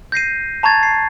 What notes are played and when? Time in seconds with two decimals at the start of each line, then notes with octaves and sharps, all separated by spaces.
0.12 G6 A#6 C7 D#7
0.63 A5 A#5 C#6 G#6 A6
0.83 C7